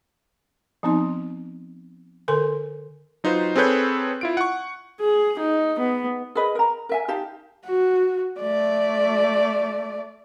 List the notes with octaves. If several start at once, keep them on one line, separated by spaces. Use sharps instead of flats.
F3 B3 C4 D#4 C6
D3 A4 A#4 G#5 C6
F#3 D#4 F4 B4 C5
C4 G#4 A4 B4 C#5 G6
E4 F4 D7
F#5 C#6
G#4
D#4
B3
G#4 A#4 B4 D#5
A#4 A#5
A#4 E5 G#5
D#4 G4 F5 A5
F#4
A3 D5